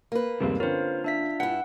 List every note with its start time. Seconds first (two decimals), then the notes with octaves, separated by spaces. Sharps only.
0.12 A#3 B4
0.40 G1 D#2 C3 G3 G#3 C4
0.60 D3 C4 C#4 F4 A#4 C5
1.04 D4 E5 B6
1.40 G2 E4 F#5